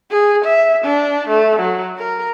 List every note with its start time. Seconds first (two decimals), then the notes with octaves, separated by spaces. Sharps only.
0.11 G#4
0.44 E5
0.84 D4
1.28 A3
1.59 F#3
1.98 A#4